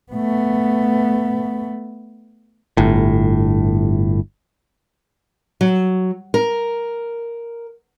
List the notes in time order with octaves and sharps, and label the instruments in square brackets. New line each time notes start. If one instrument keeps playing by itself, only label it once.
[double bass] A3 B3
[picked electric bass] G1 A2
[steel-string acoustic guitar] F#3
A#4